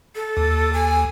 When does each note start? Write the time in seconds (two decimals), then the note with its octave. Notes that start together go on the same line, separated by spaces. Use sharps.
0.16 A4
0.37 D#2
0.74 D#2 G#5